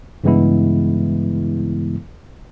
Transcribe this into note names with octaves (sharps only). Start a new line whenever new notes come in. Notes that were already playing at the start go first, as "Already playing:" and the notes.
G2 C#3 E3 G#3 B3 E4